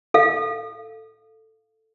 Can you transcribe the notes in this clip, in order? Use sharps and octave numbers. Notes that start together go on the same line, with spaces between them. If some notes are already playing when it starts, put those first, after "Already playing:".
A4 F5